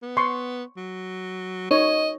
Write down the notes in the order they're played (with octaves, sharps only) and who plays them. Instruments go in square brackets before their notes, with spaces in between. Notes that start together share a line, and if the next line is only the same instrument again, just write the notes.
[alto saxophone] B3
[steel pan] C6 C#6
[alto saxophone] F#3
[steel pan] D#4 C#5 [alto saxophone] D#5